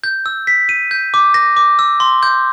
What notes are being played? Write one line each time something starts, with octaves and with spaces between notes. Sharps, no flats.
G6
E6
B6
D#7
G6
D6
A#6
D6
E6
C6
G6